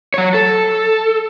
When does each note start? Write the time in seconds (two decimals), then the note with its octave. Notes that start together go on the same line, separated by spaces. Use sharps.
0.14 F#3 C#5
0.34 A4